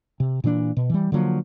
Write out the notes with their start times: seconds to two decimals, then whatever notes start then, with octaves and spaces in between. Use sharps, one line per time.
0.20 C3
0.44 A#2 E3 C4 D4
0.77 B2
0.90 E3 G3
1.12 D3 F3 F#3 A#3